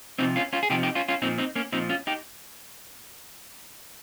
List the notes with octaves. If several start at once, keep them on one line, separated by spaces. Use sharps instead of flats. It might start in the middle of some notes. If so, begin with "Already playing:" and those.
C3 F3 C4 D#4
C#4 F4
C#4 F4
G#4
C3 F3 D#4 G4
D#4 G4
C#4 F4
C#4 F4
A#2 F3 C4 D#4
C4 D#4
A#3 C#4
A#2 F3 C4 D#4
C#4 F4
D#4 G4